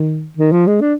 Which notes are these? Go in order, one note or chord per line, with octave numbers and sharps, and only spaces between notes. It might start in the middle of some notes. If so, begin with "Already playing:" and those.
Already playing: D#3
D#3
F3
G#3
D4